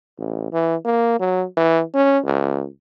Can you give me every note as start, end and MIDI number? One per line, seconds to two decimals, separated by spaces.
0.18 0.50 33
0.53 0.76 52
0.85 1.19 58
1.20 1.45 54
1.57 1.82 52
1.94 2.19 61
2.24 2.66 37